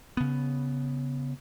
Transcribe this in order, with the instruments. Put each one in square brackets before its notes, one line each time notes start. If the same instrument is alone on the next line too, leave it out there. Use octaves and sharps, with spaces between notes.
[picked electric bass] C#3 B3